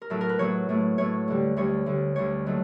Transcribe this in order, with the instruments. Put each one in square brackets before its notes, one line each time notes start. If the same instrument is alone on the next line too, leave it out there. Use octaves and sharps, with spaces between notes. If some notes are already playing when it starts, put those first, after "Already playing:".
[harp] A#4
A2 F#3 A3 A4
A#4
B4
A2 F#3 A3 C#5
A2 F#3 A3
A2 F#3 A3 C#5
D2 D3 G3
D2 D3 G3 C#5
D2 D3 G3
D2 D3 G3 C#5
D#3 F#3 A3